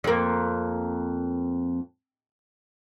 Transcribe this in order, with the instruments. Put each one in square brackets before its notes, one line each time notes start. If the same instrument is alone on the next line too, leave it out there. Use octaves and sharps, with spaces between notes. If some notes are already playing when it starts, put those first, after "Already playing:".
[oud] F2 A#3